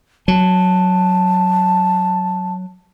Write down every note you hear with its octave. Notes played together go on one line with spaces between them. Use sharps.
F#3 A5